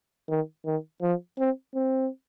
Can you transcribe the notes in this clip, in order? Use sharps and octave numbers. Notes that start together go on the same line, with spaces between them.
D#3
D#3
F3
C4
C4